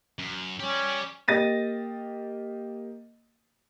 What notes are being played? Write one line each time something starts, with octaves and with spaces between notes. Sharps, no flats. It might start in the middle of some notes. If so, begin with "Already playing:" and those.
F#2
C#4 G4 D5
A#3 G4 D#5 A6 A#6 D#7